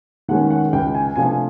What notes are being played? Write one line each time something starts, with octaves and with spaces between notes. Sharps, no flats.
D#3 G#3 C#4 F#5
F#5
C#2 G5
G#5
C3 F3 A3 D4 G#5